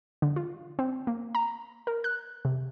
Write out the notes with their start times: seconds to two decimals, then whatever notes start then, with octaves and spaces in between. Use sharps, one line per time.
0.22 D3
0.36 F4
0.79 C4
1.07 A#3
1.35 A#5
1.87 A#4
2.04 F#6
2.45 C3